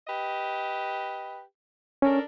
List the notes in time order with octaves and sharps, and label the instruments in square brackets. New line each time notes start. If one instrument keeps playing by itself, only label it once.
[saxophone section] G4 B4 D#5
[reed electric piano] C#4 [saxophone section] D4 A4 A#4